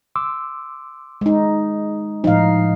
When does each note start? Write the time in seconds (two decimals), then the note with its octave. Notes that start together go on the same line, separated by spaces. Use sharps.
0.16 C6 D6 E6
1.21 G#3 D#4
2.24 A2 F3 D#4 F5